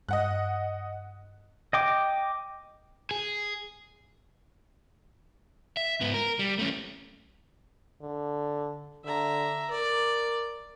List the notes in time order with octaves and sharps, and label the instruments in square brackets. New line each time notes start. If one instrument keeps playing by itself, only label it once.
[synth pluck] G2 [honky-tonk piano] D#5 F#5 F#6
[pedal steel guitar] D#5 G5 D6
[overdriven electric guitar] G#4
E5
G#2 B3
A#4
G3
A3 C#4
[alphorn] D3
[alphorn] D3 [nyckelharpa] E5 A#5
[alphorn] A#4 [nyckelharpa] D5